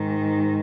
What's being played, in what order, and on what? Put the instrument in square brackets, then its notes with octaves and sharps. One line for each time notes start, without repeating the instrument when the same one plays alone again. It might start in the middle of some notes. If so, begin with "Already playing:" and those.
Already playing: [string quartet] G#2 D#3